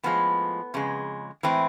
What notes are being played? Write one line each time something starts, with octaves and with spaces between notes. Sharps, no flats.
A2 F3 G#3 B3
F2 C#3 G#3
A2 E3 G#3 C4